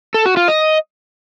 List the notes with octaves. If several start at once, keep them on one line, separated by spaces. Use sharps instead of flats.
A4
F#4
F4
D#5